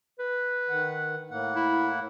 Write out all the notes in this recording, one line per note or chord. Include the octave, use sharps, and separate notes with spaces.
B4
D#3 F#5
A2 A#3 F#5
E4